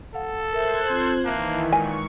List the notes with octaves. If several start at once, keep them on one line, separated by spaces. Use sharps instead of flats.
A4 F5 F#5
A#4 C5 E5 F#6 G#6
C4 F4
D#3 E3 A#3 E5 A5
A#2 G#3 G#5 C#6